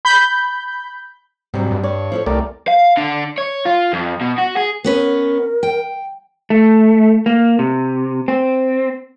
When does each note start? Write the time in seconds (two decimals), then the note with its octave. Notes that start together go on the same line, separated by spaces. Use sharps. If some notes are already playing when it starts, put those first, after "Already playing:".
0.05 B5 G6
1.54 G#2 C3 F#3 G3
1.71 G2
1.84 C#5 D5
2.12 F3 E4 A4
2.26 C2 A3 G4 A#4 D5
2.68 F5
2.97 D3
3.38 C#5
3.66 F4
3.93 F2
4.21 B2
4.38 F#4
4.57 G#4
4.84 B3 C#4 A#4 B4
5.63 G5
6.50 A3
7.26 A#3
7.59 C3
8.28 C4